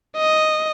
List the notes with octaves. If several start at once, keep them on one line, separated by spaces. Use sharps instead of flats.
D#5